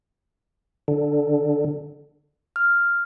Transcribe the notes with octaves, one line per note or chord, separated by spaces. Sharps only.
D3
F6